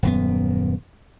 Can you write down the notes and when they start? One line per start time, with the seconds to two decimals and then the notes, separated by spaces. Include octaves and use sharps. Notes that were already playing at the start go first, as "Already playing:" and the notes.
0.03 D#1 F#2 B3